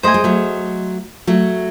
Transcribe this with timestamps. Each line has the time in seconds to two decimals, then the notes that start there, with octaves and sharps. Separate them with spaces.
0.03 A3 C5 D#5 G#5
0.14 G#3
0.24 F#3 A3
1.27 F#3 A3